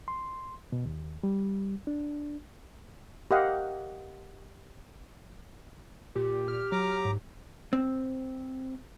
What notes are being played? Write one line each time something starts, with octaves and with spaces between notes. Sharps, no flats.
C6
B2
D#2
G3
D4
G4 A#4 D#5 F5 F#5
A#2 G4
G4 F6
F#3 A#5 D6
G#2
C4